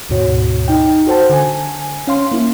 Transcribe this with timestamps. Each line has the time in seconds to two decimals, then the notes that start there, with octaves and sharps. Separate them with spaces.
0.09 D2 G#2 B2 F#4 C#5
0.68 D#4 G5
1.07 F#4 A4 C5 F#5 A5
1.30 D3 G#5
2.07 C#4 F5 C6
2.32 A#3 E4